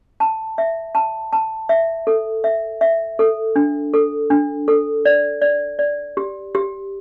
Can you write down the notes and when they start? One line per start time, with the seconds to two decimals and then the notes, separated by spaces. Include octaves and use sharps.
0.20 A5
0.58 E5
0.95 A5
1.33 A5
1.69 E5
2.07 A4
2.44 E5
2.81 E5
3.19 A4
3.56 D4
3.94 A4
4.30 D4
4.68 A4
5.05 D5
5.42 D5
5.79 D5
6.17 G4
6.55 G4